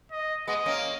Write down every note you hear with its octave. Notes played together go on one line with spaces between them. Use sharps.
D#5
G#3 B3 D#5
A#3 C#4